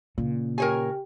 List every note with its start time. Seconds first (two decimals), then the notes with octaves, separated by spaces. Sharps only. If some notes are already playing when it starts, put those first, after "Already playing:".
0.18 A#2 C#3
0.58 G4 A#4 C#5 G5 G#5